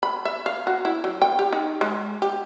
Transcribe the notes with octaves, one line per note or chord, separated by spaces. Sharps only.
B5
E5
F5
F#4
E4
F#3
G5
G4
D#4
G#3
G4